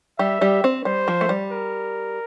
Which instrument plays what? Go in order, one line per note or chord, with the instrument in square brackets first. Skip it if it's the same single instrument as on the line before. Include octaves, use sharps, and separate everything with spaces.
[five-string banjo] G3 G4 [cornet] E5
[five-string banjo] G3 G4
C4
[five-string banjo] G3 [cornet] C5
[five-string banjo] F3
A3
G3
[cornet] A#4